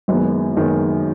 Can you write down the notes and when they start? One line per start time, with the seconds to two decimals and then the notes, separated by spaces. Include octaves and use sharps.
0.08 F#1 F#2 D#3 G#3 B3
0.57 F#1 F#2 D#3 G#3 B3